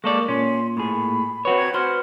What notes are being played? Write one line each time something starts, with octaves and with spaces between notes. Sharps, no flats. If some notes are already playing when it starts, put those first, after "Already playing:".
G#3 A#3 A4 D5 C#6
A#2 C#4 C6
A2 G#4 B5
C4 F#4 B4 C#5
G#6
F#4 C5 F6